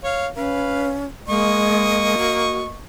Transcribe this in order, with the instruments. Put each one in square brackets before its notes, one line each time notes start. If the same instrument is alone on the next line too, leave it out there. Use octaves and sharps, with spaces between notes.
[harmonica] C#5 F5
[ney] C#4 [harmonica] B4 F5
[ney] G#3 [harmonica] A#3 D#5 C#6
[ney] F#4